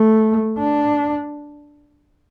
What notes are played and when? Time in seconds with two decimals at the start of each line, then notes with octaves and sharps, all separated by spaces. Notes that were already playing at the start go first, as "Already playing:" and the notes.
Already playing: A3
0.58 D4